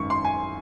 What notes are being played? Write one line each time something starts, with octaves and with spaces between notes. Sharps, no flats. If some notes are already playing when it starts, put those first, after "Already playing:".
Already playing: G#1 F#2 D#3 C#6
C6
G#5